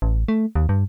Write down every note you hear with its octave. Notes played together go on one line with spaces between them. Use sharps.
A1
A3
D#2
G2